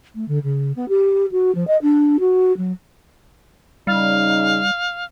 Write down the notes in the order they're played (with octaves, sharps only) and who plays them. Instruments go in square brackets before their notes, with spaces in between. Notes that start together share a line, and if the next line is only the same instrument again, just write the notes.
[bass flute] A3
D3
C#3
B3
G4
F#4
F3
D#5
D4
F#4
F#3
[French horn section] C#3 D#4 [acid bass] G3 [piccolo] F5